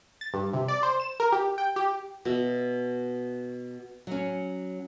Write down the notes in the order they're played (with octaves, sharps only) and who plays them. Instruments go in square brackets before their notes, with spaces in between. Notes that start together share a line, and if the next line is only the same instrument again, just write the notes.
[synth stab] A6
G2
C3
D5
C5
E7
A#4
G4
G5
G4
[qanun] B2 E5
[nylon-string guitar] F#3 C#4